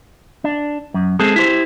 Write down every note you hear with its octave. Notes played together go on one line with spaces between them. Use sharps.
D4
F#2
G#3 C4 G#4 A4
E4 G4 C5